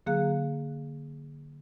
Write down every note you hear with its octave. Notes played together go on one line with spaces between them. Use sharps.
D3 F#3 A#3 G#4 F5 F#6